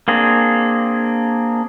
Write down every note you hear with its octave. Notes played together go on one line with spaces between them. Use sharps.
A#3 C4 D4 G#4